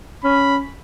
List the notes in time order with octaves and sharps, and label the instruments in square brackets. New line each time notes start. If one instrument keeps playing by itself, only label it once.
[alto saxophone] C#4 [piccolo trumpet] B5